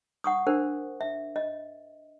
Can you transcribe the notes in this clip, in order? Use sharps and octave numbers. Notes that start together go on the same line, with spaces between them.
F#5 C#6 D#6
D4 A#4 C5
E5
D#5